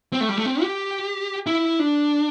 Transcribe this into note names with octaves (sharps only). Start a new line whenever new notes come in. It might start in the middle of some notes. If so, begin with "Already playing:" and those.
C4
A3
G3
A3
C4
G4
E4
D4